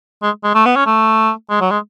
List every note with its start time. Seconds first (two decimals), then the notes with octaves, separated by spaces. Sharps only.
0.22 G#3
0.44 G#3
0.55 A3
0.65 B3
0.76 C#4
0.86 A3
1.50 G#3
1.61 F#3
1.71 G#3